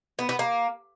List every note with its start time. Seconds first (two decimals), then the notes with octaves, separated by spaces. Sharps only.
0.19 B3
0.29 B3
0.39 A#3